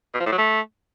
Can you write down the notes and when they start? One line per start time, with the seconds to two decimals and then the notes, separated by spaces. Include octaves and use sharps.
0.14 B2
0.20 F3
0.26 A2
0.32 F#3
0.38 A3